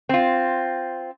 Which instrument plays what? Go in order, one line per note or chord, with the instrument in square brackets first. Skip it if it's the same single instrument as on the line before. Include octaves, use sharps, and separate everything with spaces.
[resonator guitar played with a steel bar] C4 F4